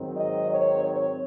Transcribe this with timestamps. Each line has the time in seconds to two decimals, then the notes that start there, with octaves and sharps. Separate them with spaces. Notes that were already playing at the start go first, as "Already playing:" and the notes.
Already playing: G#2 D#3 F#3 C4
0.16 D#5
0.50 C#5
0.83 C#5